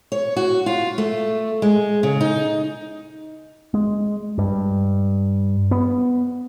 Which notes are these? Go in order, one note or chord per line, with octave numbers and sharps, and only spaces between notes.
C#5
F#4
F4
A3
G#3
C#3
D#4
G#3
G2
B3